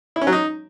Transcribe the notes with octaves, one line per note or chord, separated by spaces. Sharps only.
E4
C#4
F#3
D#4